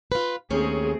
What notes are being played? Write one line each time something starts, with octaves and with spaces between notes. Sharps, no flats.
F4 B4
D#2 A3 C4 C#4 G#4